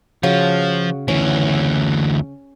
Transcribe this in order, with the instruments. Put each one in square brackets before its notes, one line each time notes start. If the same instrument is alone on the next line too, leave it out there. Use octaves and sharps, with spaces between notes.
[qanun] C#3 F#4 C#5 [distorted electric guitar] F3
[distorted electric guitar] D2 E3 [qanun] C#4